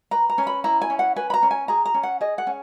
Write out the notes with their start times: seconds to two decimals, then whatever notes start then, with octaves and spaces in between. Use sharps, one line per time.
0.11 B4 A#5
0.30 A#5
0.38 C#4
0.47 B5
0.64 E4 A#5
0.82 G#5
0.90 C#4
0.99 F#5
1.16 B4 G#5
1.30 B5
1.34 A#5
1.43 C#4
1.51 G#5
1.68 G#4 A#5
1.85 A#5
1.94 C#4
2.03 F#5
2.21 G#4 D#5
2.38 F#5
2.47 C#4